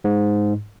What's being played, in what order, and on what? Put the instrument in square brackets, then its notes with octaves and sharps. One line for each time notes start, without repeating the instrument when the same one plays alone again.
[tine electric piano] G#2